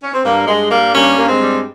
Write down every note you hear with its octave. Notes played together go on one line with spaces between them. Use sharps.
C#4
C4
G2 A#3
G2 G#3
G3 A#3
G2 A#3 C#4
G2 A#3
G#3 C4
G3